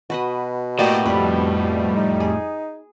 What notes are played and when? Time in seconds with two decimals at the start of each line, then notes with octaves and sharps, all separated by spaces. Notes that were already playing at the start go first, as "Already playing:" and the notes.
0.10 B2 F#4 B4 D#5
0.79 A2 A#3 F#4 G4 D5 D#5
1.06 F2 G3 B4
1.96 D#4
2.20 G#4